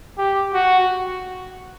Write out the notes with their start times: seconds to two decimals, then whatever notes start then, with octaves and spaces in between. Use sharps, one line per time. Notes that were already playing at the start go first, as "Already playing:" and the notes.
0.18 G4
0.54 F#4